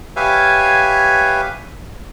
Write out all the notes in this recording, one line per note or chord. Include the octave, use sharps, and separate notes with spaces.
G4 B4 C#5 E5 F5 G#5